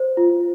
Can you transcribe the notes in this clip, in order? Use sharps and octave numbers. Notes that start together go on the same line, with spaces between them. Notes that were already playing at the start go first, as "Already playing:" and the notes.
Already playing: C5
F4